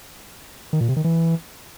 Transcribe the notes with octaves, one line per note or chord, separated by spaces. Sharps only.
D#3
A#2
C3
D#3
E3